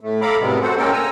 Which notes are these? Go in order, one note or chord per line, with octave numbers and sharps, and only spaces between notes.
A2 A3
A4 F5 A#5 B5 D6
F#2 A2 C3 G3 G#3 B3
F#4 A4 C5 F#5
G#3 A#3 C#4 A4 A#4 G5
G#5 A#5 E6